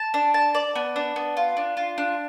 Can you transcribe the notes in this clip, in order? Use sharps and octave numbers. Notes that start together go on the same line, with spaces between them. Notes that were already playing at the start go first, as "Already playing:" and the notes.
Already playing: A5
D4
A5
D5
B3
D4
B3
F4
D4
F4
D4